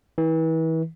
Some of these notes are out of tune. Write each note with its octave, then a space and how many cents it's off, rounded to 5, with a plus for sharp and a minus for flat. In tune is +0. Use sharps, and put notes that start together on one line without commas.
E3 -35